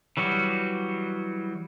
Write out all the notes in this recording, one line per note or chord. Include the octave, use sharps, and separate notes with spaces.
E3 F#3 G3 F#4